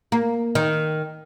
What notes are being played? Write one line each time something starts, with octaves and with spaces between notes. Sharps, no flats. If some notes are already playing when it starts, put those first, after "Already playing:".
A#3
D#3